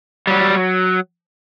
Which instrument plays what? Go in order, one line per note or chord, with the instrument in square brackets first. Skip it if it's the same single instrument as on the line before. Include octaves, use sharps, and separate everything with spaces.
[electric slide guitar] F#3 G3